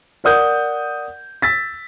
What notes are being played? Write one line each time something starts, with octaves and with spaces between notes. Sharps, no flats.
A#4 D5 F#5 D#6 G6
E6 A6 B6